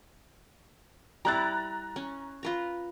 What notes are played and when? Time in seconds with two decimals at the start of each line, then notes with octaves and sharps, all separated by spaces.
1.25 G3 E4 A#5 F#6 A6
1.96 C#4
2.43 F4 B4 A#5